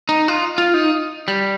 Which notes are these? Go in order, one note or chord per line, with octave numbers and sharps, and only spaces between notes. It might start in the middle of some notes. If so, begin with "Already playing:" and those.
D#4
F4
F4
D#4
G3